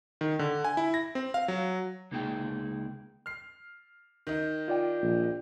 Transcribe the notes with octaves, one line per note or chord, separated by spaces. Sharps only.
D#3
D3
G#5
E4
A#6
C4
F5
F#3
C#2 A#3 D#4 G#4 G5
F6 C7
D#3 D#4
F4 D5 G5
A#1